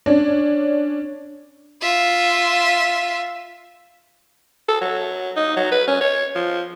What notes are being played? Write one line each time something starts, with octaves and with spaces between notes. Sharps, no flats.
C#4 D4
F4 E5
A4
F#3
D#4
F#3
B4
C#4
C#5
F3